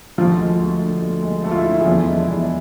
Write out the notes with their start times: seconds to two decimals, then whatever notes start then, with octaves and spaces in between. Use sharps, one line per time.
0.18 D2 F3 F4
0.39 G#3
0.60 D2
0.81 D3
1.02 D2
1.23 G#3
1.43 D2 A3 A4
1.51 F4
1.58 E4
1.64 D3
1.71 E4
1.81 G#4
1.86 E2 F3 F4
1.99 E4
2.07 G#3
2.13 D4
2.28 E2 E4